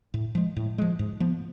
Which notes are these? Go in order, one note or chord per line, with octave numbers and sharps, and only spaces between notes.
A2
F3 G#3
A2
F3 G#3
G#2
F3 B3